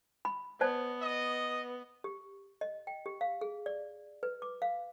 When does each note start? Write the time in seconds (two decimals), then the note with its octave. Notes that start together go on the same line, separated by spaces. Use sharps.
0.25 B5
0.61 B3 C5 D5 A5
1.02 D#5
2.04 G4
2.61 D#5
2.87 G5
3.06 G4
3.21 F5
3.41 G#4
3.66 D5
4.23 B4
4.42 D6
4.62 F5